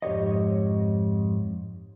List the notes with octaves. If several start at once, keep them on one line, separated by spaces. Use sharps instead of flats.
F2 G#2 G4 C#5 D#5